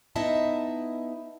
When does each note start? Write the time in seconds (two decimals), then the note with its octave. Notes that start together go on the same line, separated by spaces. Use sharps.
0.16 B3 D#4 E4 D#5 E5 A5